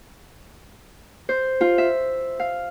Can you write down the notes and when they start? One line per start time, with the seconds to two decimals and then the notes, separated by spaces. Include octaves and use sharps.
1.29 C5
1.61 F4
1.78 E5
2.40 F5